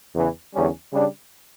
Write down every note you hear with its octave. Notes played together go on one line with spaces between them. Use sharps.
E2 C#3 E3
E2 D3 G3 C#4
C#3 G3 D4